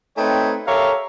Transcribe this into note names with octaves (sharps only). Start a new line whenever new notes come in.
A3 C4 D#4 B4 C#5 G5
G4 A4 A#4 C#5 E5 F5